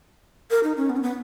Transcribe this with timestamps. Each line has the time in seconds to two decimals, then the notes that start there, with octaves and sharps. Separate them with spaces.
0.51 A#4
0.63 D#4
0.77 C#4
0.89 B3
0.97 C#4
1.03 B3